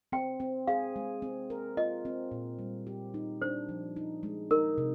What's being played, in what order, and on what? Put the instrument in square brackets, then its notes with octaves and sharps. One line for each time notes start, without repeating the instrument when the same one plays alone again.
[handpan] C4 [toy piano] G5
[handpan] C4
[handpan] G#4 [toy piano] F5
[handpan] G#3
C4
A#4
[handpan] F4 [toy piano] D#5
[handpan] C4
A#2
G3
G4
D#4
[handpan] D4 [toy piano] C5
[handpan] F3
D#4
G#3
[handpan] D#4 [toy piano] A#4
[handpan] C3